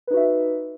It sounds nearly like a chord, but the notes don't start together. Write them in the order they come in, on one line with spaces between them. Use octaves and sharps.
B4 D#4 F#4 E5